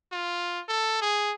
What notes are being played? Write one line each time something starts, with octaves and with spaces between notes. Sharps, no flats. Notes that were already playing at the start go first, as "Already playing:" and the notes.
F4
A4
G#4